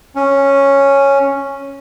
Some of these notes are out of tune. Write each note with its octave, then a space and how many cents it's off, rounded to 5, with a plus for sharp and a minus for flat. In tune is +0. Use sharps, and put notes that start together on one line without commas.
C#4 -5